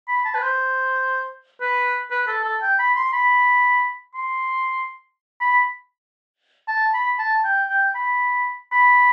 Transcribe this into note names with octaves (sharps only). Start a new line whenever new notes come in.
B5
A5
B4
C5
B4
B4
A4
A4
G5
B5
C6
B5
C6
B5
A5
B5
A5
G5
G5
B5
B5